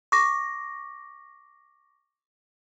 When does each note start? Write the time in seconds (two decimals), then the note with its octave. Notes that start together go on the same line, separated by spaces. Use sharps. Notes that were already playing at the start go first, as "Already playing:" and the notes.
0.12 C#6 D6 A#6